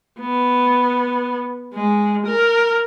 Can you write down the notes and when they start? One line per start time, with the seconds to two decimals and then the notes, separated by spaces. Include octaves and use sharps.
0.20 B3
1.74 G#3
2.27 A#4